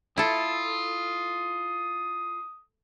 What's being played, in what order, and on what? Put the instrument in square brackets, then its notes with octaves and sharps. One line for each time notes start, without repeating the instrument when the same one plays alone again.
[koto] E4 A4 [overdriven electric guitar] F4 [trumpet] D#6